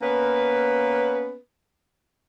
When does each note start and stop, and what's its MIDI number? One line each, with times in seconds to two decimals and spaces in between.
0.02 1.37 58
0.02 1.37 59
0.02 1.37 61
0.02 1.37 71